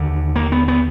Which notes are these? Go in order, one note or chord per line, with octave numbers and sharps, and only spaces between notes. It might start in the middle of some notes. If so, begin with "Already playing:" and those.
Already playing: D#2 D3
A#3
B3
B3